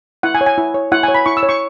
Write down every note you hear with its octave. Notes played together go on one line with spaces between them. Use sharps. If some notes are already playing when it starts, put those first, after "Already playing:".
E4 F#5
G#5
C#5
G#5
E4
C#5
E4 F#5
G#5
C#5
B5
E4 C#6
E6
C#5
C#6